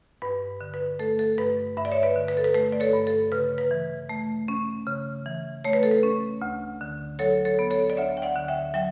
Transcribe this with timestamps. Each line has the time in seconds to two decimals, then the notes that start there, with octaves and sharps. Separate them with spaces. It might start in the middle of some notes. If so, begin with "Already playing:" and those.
0.22 G2 B4
0.61 D3
0.74 B4
0.99 A3 A4
1.19 A4
1.38 G2 B4
1.77 G2 E5
1.85 D5
1.92 C#5 E5
2.03 B4 D5
2.16 D3
2.28 B4
2.37 A4
2.44 B4
2.55 A3 B4
2.72 D5
2.80 A4 C#5
2.93 G2
3.07 A4
3.32 C#3 B4
3.58 B4
3.71 E3
4.09 A3
4.48 C#4
4.87 C#3
5.26 E3
5.64 A3 C#5
5.73 B4
5.83 A4
5.91 B4
6.03 C#4
6.42 D2
6.81 D3
7.19 F#3 A4 C#5
7.45 A4 C#5
7.59 B3
7.71 A4 C#5
7.90 D5
7.97 D2 C#5 E5
8.17 G5
8.22 D5 F#5
8.36 D3
8.48 E5 G5
8.74 F#3 E5 G5